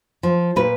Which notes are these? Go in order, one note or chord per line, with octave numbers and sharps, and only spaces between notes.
F3
A#2 B4